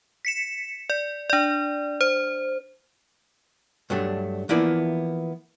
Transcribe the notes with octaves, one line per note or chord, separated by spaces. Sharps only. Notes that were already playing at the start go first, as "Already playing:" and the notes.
B6 C#7 E7
D5
D4 D5
C5
G2 F#3 A3 D4
E3 F3 A#3 B3 E4 D5